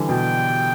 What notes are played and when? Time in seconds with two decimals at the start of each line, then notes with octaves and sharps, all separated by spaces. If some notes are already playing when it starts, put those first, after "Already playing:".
Already playing: D3 E3 G3
0.09 B2 G5